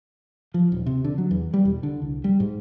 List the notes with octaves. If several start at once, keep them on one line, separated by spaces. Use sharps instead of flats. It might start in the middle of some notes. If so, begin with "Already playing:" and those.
F3
D#1
C3
D3
F#3
E2
G3
E1
D3
C2
G3
G#2